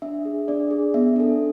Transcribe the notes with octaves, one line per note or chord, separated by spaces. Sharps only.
D4 E5
G#4
D4 D5
G#4
B3 E5
D4 A4